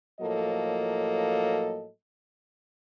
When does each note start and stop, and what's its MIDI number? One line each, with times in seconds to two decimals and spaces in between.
0.20 1.87 45
0.20 1.87 53
0.20 1.87 54
0.20 1.87 58
0.20 1.87 69
0.20 1.87 75